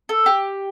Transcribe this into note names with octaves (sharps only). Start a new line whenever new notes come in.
A4
G4